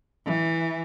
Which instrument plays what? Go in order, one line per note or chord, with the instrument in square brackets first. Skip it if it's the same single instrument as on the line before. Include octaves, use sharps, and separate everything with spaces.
[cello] E3